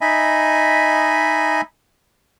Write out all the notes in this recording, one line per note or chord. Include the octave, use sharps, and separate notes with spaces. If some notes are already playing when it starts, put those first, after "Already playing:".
D#4 D#5 E5 G#5 B5